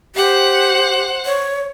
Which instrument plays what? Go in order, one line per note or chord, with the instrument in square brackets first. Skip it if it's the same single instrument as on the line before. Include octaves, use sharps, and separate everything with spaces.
[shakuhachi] G4 [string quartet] C5 F#5
[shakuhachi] C#5